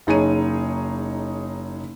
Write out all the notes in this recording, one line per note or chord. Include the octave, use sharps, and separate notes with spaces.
F#1 D#4 G#4 C#5 D#7